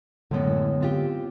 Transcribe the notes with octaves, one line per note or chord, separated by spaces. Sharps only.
F#2 A2 D3 G#3 B3
C4 F4 G4